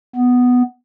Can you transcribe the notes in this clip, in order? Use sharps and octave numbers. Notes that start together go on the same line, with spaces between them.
B3